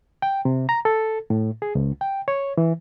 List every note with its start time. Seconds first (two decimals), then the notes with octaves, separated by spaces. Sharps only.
0.22 G5
0.45 C3
0.69 A#5
0.85 A4
1.30 A2
1.62 G#4
1.75 C#2
2.01 G5
2.28 C#5
2.57 E3